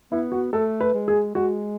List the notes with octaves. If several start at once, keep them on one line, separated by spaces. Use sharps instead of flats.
B3 E4
F#4
A3 A4
B4
G#3
G#4
G#3 F#4